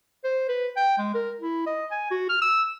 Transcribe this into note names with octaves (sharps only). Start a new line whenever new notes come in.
C5
B4
G5
G#3
A#4
E4
D#5
G#5
F#4
F6
E6